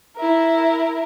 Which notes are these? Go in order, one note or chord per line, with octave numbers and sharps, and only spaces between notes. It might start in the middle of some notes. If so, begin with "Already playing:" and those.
E4 A#4